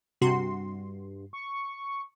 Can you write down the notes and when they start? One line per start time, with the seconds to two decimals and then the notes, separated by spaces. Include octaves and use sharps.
0.21 G2 C3 F#4 C6
1.33 C#6